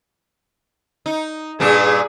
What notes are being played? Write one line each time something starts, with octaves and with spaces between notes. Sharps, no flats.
D#4
G2 A#2 D4 G#4